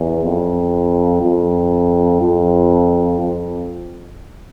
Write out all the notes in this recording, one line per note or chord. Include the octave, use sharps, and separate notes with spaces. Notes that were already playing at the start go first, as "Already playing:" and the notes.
Already playing: E2
F2
F2
F2
F2